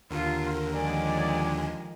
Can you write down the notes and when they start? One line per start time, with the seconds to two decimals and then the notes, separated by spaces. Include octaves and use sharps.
0.11 D#2 D3 F4 A#4
0.73 D#3 F3 F#3 G#3 D5 G#5